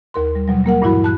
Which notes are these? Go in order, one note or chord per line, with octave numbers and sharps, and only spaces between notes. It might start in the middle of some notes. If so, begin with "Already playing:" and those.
D#2 A#4 C6
G3
B2 F#3 G3
G3 A#3 A#4 F#5
G2 A#2 E3 E4 F#4 B5
A5 F#6